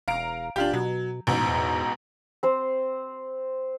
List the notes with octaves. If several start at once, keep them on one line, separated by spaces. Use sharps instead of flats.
E1 F5 A#5 D7
D1 D4 F4 G4
B2 F#3
A1 G#2 B2
E2
C4 C5